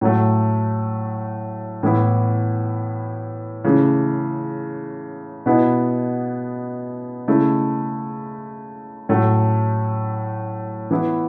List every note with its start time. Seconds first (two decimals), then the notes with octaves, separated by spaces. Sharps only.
0.01 A2 F#3 A3
1.83 A2 E3 B3 E4
3.64 C#3 E3 A3
5.46 B2 B3 E4
7.28 C#3 A3 E4
9.09 A2 F#3 A3
10.91 E3 B3 E4